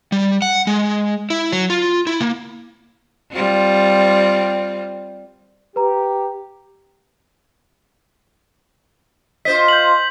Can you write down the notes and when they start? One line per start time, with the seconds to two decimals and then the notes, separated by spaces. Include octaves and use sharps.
0.12 G3
0.42 F#5
0.67 G#3
1.30 E4
1.52 F#3
1.70 F4
2.07 E4
2.20 A#3
3.32 G3 C4 F4
5.76 G4 B4 A#5
9.45 F4 C5 D#5 B6
9.68 G6 F#7